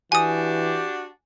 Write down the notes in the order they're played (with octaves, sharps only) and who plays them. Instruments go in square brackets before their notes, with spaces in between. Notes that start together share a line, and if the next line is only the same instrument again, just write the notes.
[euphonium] E3 [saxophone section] D4 F#4 G4 [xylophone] G#5 D#6